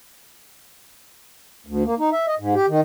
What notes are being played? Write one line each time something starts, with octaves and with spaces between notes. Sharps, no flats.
D2
A#3
D#4
E5
D#5
G#2
G4
D#3